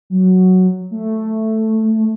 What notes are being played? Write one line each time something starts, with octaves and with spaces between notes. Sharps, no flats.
F#3
A3